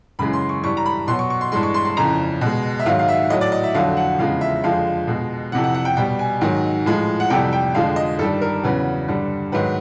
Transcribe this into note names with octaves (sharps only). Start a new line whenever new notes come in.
F#2 C#3 E3 G#3 B5
C6
C#6
G2 E3 G3 C#6
A#5
B5
B2 F#3 C6
C#6
C#6
C6
G2 E3 G#3 C6
C#6
C6
C6
F2 C#3 E3 A#5
B2 G#3
E5
G#2 D#3 F#3 F5
F5
E5
A2 F#3 D#5
D5
D#5
E5
F2 D3 F#3 F5
F#5
E2 C#3 F3 G#3 F5
E5
F2 D3 F3 G#3 F5
B2 G#3
F2 C3 E3 F#5
F#5
F#5
G5
B2 G3 G5
G#5
G#2 D#3 F#3
A2 F3 G#3
F#5
F2 C3 E3 G3 G5
G5
F2 D3 F3 G#3 F5
D#5
G2 D#3 G3 A4
A#4
E2 C#3 F#3 B4
G2 D3 G3
G#2 D#3 F#3 B4